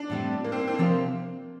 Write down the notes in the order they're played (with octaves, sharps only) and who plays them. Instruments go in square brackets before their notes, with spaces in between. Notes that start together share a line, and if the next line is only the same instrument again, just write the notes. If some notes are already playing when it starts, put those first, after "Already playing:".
Already playing: [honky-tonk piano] D4
[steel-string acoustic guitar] A2 G3 C4
[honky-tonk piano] A#3
C4
A#3
C4
A#3
[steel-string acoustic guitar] C3 F3 C4 G4 C5